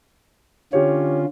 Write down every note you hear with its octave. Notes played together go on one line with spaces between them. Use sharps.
D3 C#4 F4 G4 C#5